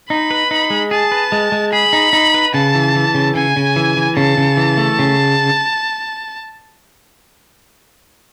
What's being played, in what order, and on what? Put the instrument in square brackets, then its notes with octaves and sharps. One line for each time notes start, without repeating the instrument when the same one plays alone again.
[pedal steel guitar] D#4 [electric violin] B5
[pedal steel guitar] B4
D#4
G#3
[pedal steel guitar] G#4 [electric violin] A5
[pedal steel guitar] B4
G#3
G#3
[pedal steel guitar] G#4 [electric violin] B5
[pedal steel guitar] D#4
D#4
B4
[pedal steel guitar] C#3 [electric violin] A5
[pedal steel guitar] E3
E3
C#3
[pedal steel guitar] C#3 [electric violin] G#5
[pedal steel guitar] C#3
E3
E3
[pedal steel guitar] C#3 [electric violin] A5
[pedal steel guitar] C#3
E3
A3
C#3